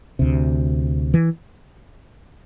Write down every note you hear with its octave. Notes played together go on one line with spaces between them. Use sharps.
D2 C3
E3